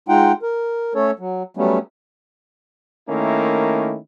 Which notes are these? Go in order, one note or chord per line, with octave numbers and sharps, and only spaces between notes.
G#3 D#4 F4 F#5 G5
A#4
A3 C#4 A4 C#5
F#3
F#3 G3 A3 B3 C#4
D#3 A3 A#3 C#4 E4